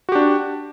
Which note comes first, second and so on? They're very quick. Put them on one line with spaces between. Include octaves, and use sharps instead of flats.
F#4 G4 D4